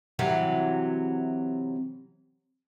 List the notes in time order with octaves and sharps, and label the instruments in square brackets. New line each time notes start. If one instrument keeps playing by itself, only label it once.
[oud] C3 E3 F#3